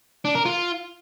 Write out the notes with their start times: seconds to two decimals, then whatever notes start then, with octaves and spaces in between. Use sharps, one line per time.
0.25 D4
0.35 A#4
0.46 F4